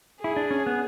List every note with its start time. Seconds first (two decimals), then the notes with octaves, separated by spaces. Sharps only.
0.20 E4 G#4
0.36 D4
0.51 C#4
0.66 B3